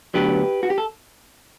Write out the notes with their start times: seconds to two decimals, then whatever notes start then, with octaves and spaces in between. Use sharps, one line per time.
0.14 D2 D3 F#3 B3 G4 B4
0.63 F#4
0.70 G4
0.78 A4